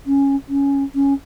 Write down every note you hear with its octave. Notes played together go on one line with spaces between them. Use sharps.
C#4
C#4
C#4